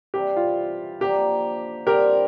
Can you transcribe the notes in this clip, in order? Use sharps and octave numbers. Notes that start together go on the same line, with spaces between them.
C3 E3 G3 G4
F4
D3 F3 A#3 D4 G4
D3 G3 C4 F4 G4 A#4